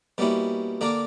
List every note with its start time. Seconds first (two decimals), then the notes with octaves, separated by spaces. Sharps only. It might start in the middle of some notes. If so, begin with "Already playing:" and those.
0.18 B2 G3 A#3 C#4 E4
0.81 D3 A#3 D4 A#4 D5